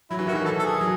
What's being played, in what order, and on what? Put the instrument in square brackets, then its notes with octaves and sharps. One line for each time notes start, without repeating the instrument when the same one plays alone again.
[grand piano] F#3 [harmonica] E4
[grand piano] E3
[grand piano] D#3 [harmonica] F#4
[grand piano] E3
[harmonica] A4
A4
G#4
[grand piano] F#3